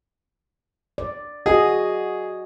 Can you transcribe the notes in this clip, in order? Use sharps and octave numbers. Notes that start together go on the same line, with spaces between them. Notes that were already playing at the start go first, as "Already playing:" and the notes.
D5
F#4 G#4 D#5